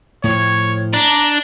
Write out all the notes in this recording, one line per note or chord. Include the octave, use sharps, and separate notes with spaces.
A2 F3 C#5
D4 A#5